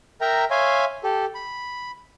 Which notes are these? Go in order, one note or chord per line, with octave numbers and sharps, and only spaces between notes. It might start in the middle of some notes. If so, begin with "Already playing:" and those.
A#4 E5 G5 A#5
C#5 E5 F5 G#5 C6
G4 A4
B5